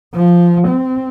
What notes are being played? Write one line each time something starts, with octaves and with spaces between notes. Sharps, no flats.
F3
C4